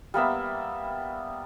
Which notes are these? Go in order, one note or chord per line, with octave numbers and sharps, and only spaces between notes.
G3 A#3 B3 E5